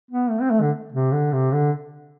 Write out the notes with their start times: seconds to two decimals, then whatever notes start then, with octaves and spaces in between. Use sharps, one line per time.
0.11 B3
0.30 A3
0.42 C4
0.51 A3
0.61 D3
0.92 C3
1.12 D3
1.33 C3
1.53 D3